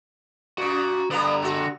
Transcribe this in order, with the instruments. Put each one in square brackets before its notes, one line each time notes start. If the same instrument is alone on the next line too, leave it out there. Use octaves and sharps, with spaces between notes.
[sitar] F#2 A#2 [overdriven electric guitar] F#4
[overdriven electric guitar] D3 A#5 [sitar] G3 A#3 B3
[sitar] G#3 F#4